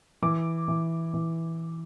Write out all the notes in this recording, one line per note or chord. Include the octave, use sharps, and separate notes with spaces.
E3 D6
E3
E3